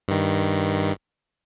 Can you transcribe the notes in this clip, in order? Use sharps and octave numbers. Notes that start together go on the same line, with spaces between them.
G2 D#3